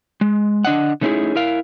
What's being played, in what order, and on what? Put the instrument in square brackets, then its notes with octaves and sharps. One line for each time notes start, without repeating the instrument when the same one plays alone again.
[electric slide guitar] G#3
D3 D4 D#5 F#5
D3 A3 C#4 D#4 E4 G#4
E4 A#4 F5